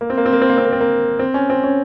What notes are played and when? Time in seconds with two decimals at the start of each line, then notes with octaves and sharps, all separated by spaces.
0.01 A#3
0.10 C4
0.18 A#3
0.26 C4
0.33 A#3
0.41 C4
0.49 A#3
0.58 C4
0.65 A#3
0.72 C4
0.81 A#3
1.19 C4
1.34 C#4
1.50 C4
1.64 C#4